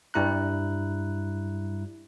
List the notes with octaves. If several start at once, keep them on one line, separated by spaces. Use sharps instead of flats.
G2 G3 E4 A#5 F#6